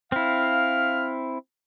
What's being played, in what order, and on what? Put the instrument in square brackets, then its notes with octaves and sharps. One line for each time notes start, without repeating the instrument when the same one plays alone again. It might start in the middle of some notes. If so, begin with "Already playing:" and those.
[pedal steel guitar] C4 E4 [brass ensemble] F5 [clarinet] F6